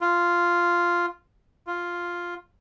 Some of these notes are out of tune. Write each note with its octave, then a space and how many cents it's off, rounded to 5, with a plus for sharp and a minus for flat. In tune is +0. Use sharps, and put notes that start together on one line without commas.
F4 -5
F4 +0